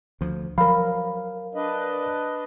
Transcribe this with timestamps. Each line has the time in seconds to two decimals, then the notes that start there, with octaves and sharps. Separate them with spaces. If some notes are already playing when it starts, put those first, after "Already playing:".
0.21 D2 F3
0.58 F3 F#3 A#4 F5 B5
1.55 D4 B4 D#5